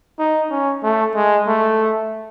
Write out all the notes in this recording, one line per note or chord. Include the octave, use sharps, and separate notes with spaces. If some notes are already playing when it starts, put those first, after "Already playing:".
D#4
C#4
A3
G#3
A3